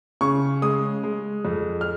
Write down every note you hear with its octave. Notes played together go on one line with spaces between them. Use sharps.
C#3 C#6
G#3 D#6
G#3
F2
F6